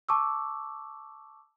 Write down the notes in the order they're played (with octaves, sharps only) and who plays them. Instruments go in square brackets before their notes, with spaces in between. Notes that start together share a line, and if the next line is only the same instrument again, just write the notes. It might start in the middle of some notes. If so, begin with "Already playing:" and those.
[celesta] A5 C#6 D6 E6